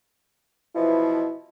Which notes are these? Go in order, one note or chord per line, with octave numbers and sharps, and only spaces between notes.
B2 E3 F3 E4